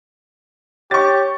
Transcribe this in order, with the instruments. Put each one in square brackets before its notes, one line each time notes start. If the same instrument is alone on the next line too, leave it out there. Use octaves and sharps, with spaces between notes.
[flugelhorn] G4 [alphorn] C#5 [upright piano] C#6 A6